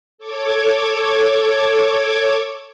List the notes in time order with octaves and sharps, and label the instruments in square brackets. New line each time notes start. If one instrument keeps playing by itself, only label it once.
[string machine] A4 C#5 D6 G#6